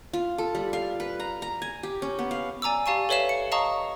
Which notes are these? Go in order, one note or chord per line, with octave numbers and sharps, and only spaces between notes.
F4
A4
G3
F5
B4
A#5
A#5
G#5
G4
C#4
B3
F5
D5 G#5 A#5 D6 E6
G4 D5 F5 A5 C#6 D#7
A4 B4 C#5 E5 F5 E7
C#7
D#5 F5 A5 A#5 C#6 D#6